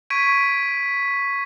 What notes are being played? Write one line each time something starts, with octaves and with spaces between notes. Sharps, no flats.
C#6 G#6 B6 D7 D#7